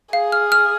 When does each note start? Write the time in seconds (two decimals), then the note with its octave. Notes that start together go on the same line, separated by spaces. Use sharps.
0.13 G#4 F5
0.32 F6
0.52 F6